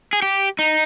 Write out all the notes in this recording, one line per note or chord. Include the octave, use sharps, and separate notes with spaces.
G#4
G4
D#4